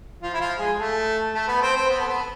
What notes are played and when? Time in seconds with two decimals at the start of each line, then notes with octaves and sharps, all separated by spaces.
0.22 F3 F4
0.34 E4
0.40 F3 F4
0.59 G#3 G#4
0.78 A3 A4
1.34 A3 A4
1.48 B3 B4
1.62 C4 C5
1.75 C4 C5
1.90 B3 B4
2.00 A4
2.08 B3 B4